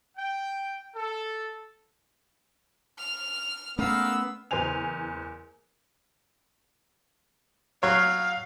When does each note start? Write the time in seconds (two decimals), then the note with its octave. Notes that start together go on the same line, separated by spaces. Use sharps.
0.17 G5
0.95 A4
2.98 F6 F7
3.79 G#3 A3 B3 C#4 A#4 F5 E6
4.51 F#1 E2 C5 G#5 F7
7.83 F#3 C#5 F5